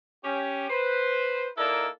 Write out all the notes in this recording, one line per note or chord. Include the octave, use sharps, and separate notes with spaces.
C#4 G4
B4 C5
A#3 D#4 E4 A4 A#4 D5